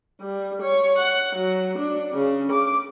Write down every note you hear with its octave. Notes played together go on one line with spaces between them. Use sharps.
G3
C#5
F#5
F#3
D4
C#3
D6